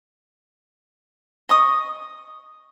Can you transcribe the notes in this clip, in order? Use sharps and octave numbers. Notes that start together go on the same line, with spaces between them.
D#5 C#6 D#6